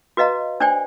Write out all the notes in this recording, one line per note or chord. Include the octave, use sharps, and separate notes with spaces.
F#4 B4 D#5 F5 A#5
D4 C5 D5 G5 G#5